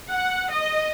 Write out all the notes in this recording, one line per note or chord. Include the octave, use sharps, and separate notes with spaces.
F#5
D#5